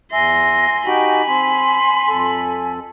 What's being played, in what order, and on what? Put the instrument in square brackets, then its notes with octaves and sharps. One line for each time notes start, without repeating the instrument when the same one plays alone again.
[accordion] E2 E5 [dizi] G#5 [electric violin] C6 [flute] A#6
[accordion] D#4 F#4 G4 [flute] G5 [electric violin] B5
[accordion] C4 [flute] C6
[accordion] F2 A4